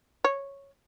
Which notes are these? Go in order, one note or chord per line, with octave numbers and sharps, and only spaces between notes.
C#5